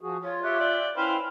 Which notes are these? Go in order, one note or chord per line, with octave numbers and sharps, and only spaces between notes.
F3 F#4 G#4
F4 C#5
G4 C#5 E5 F#6
D5 G5
C#4 E4 B4 C5 F5 G5